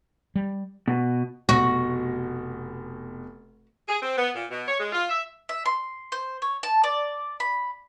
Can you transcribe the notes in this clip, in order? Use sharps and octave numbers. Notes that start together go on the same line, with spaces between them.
G3
B2
F1 B2 F#4 A#6
G#4
C4
B3
A#2
B2
C#5
G#3
F4
E5
E5
C6
C5
C#5
A5
D5
B5